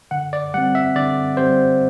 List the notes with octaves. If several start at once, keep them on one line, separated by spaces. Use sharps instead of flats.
D3 F#5
D5
G3 C4 F#5
E5
D3 D5
G3 C4 C5